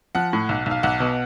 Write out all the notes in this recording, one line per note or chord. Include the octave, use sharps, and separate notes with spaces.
F3 F#5
A2
B1
B1
F5
B1 F#5
B2